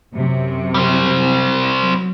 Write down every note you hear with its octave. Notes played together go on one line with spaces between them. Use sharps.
F#2 C3
G3 C4
F#3